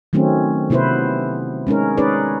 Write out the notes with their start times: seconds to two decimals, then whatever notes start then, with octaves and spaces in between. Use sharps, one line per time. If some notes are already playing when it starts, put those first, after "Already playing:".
0.13 D#3 F#3 A3 C4 C#4
0.70 C3 B3 E4 B4 C5
1.67 G#3 C#4 D#4 A#4
1.97 C#4 D#4 G#4 B4 C#5 D5